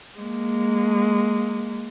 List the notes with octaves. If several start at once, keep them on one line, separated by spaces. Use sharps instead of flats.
G#3 A#3